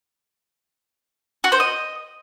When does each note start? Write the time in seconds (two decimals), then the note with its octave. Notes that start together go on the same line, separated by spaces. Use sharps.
1.44 F#4
1.52 C5
1.60 D#5